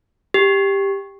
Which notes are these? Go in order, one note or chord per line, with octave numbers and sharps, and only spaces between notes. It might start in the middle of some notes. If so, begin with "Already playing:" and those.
G4